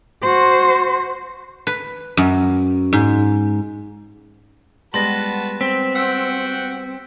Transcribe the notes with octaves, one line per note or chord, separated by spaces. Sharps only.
F#4 C5
B4
F#2
G#2
G3 G#3 B3 F#4 B4 A5 C6 A#6
C4 B6
F#4 F#5 G5 E6 B6